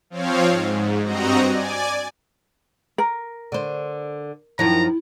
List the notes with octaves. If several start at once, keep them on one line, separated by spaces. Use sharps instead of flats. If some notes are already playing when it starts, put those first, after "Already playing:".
F3 C4 C#5 F5
G#2
G2 C4 F#4 D#5 A#5
D5 G#5
A#4
D3 C5
F#2 D#3 F3 E4 A#5